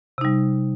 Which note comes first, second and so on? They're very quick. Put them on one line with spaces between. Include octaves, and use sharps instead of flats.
C3 D#4 G3